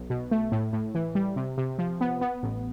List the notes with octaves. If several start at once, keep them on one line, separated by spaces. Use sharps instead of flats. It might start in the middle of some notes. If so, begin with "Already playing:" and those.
Already playing: B1
B2
A3
A2
A2
E3
G3
C3
C3
F3
B3
B3
A1